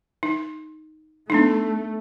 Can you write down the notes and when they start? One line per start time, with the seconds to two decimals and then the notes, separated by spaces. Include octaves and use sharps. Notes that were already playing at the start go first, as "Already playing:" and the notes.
0.23 D#4
1.30 A3 B3 D4 D#4